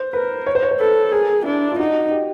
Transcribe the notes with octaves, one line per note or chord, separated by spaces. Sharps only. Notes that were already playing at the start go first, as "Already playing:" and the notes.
Already playing: C5
A#4 B4
C#5
C5
C#5
C5
A4 B4
G#4 A#4
D4 E4
F4
D#4 F#4
G4